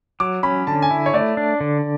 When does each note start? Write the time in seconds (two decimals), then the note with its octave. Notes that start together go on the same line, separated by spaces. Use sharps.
0.20 F#3 D6
0.43 C#4 B5
0.67 D3 A5
0.82 G#5
0.91 E4
1.06 C#5
1.14 A3 D5
1.37 D4
1.61 D3